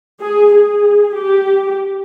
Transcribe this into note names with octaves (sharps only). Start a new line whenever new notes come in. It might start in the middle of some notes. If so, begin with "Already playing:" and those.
G#4
G#4
G4